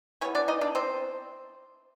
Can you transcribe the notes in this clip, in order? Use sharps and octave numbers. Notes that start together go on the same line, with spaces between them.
E3 G3 B3 C#4 C#5
D4 D5
D#4 D#5
D4 D5
C4 C5